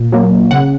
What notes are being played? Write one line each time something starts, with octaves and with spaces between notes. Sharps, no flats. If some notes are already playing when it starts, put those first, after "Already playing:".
Already playing: A#2
F#3 A#3
C#3 F#5